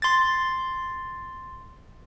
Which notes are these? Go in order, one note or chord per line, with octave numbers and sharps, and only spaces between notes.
C6 A6